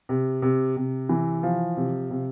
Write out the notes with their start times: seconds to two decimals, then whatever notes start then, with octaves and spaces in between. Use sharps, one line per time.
0.09 C3
0.42 C3
0.76 C3
1.09 E3
1.43 F3
1.77 C3
2.10 C3